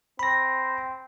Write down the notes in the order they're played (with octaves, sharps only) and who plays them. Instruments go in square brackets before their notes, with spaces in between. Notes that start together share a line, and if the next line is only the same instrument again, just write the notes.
[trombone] C4 [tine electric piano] B5 A#6